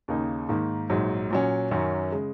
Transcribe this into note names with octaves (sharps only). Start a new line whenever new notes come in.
D#2 C#3 A#3 D#4
G#2 D#3 A#3
A#1 G#2 F#3
A#2 F#3 C#4
F#2 D#3 F#3 C#4
C#3 G#3